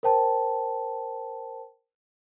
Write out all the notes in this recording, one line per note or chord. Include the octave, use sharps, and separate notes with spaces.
A#4 C5 G5 A5